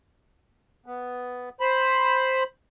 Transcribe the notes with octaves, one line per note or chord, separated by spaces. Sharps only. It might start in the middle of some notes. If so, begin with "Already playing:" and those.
B3
C5 B5